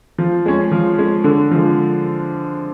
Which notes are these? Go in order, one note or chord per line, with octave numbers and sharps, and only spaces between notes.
F3
G#3 C#4
F3
G#3 C#4
D3
F3 G#3